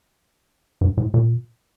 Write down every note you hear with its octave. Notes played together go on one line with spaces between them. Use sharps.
G2
A2
A#2